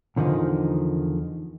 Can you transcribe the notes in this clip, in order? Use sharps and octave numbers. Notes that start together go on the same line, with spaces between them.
E2 D3 D#3 F3 D#4